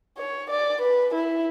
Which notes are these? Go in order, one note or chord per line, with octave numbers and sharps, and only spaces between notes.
C#5
D5
B4
E4